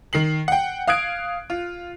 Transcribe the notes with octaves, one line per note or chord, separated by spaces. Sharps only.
D#3 C7 F#7
F#5 G5
F5 D#6 F#6 G#6 D7
F4